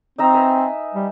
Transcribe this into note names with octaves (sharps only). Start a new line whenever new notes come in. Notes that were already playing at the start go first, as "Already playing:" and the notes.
C4 D#4 E5 A#5
B4 G#5
G3